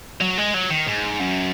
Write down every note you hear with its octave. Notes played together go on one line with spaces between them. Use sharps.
F#3
G#3
F#3
D#3
G#2
F#2